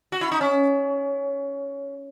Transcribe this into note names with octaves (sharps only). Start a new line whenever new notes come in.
F#4
E4
D#4
C#4